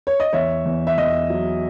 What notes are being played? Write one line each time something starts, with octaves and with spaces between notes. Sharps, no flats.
C#5
D#5
E2 C#5 E5
E2
E5
E2 D#5
F#3